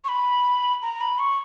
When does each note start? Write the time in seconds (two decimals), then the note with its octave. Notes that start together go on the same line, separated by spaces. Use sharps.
0.04 C#6
0.08 B5
0.82 A#5
1.01 B5
1.19 C#6